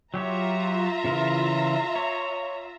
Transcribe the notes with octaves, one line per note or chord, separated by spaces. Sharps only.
F#3 F4 G4 C#5 E5 A#5
C#3 E3 A#4
C#5